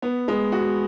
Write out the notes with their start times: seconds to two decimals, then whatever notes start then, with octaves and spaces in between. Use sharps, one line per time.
0.02 B3
0.28 G#3
0.52 F#4